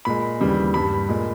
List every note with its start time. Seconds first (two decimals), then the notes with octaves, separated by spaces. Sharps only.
0.05 A#2 G#3 B5
0.40 D#2 C#3 E3 G3
0.74 G2 G3 B5
1.09 A#2 G#3